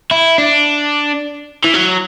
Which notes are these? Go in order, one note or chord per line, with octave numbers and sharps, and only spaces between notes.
E4
D4
E3
F#3